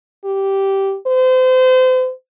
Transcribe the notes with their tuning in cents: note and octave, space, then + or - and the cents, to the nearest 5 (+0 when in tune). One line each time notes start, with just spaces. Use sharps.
G4 -10
C5 -35